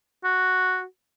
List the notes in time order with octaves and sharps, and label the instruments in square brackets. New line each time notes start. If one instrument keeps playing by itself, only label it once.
[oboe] F#4